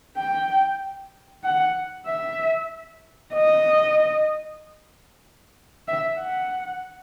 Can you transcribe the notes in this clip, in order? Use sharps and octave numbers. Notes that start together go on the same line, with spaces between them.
G5
F#5
E5
D#5
E5
F#5